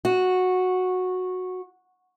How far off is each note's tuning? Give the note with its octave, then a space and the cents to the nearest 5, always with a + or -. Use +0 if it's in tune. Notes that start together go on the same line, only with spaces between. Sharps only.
F#4 -10